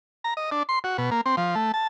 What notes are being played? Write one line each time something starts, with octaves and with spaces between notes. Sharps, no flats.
A#5
D#5
D4
C6
F#4
B2
A#3
C4
F3
A3
A5